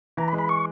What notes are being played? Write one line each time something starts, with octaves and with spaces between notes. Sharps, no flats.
E3 A#5
B5
G#3
B5
C#6